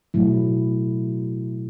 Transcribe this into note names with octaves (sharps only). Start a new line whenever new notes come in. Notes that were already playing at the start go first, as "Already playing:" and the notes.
B2 F#3 A3 E4